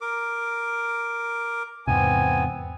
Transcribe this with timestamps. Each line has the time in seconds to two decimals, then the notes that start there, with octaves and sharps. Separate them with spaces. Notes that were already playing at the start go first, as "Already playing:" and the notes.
0.01 A#4 D6
1.87 E2 G#2 C3 B3 C4 G#5